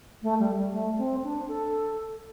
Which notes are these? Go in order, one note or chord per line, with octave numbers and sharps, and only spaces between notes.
A3
G3
G3
A3
C4
D4
A4